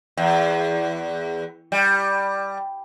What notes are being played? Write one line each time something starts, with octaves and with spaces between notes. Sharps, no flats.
E2
G3